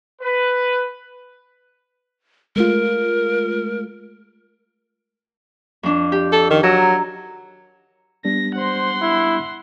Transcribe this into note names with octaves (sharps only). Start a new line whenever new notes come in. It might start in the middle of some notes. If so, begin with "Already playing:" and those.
B4
G#3 A3 F4 A#4
F2 D4
G4
A4
D#3
F#3 A#5 E6
G3 B3 D4 A#6
C5 F#5 C6
E4